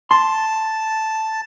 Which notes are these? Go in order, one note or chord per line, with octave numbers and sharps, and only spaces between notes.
A5 C6